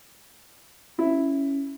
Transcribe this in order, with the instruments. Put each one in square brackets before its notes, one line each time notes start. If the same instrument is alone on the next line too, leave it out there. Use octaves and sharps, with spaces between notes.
[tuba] C#4 [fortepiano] E4